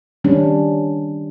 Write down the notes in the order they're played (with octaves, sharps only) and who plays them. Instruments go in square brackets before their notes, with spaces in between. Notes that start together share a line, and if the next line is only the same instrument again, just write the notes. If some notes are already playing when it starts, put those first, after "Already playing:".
[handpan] D#3 G3 C#4 D4